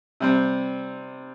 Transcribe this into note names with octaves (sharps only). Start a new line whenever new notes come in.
C3 G3 C4